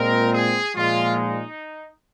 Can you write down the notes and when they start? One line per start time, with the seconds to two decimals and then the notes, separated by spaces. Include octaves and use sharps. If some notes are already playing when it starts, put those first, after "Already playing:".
Already playing: A#2 G#3 C4 A#4
0.33 G#4
0.75 A#2 F3 G#3 F4
1.16 D#4